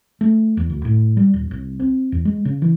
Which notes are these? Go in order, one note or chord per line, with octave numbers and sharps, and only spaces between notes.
A3
E2
D2
A2
G3
D#1
C2
C4
E2
G#3
C#3
E3